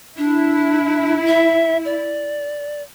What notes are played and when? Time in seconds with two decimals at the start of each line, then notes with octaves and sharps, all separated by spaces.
0.18 D4 E4
1.27 E5
1.85 D5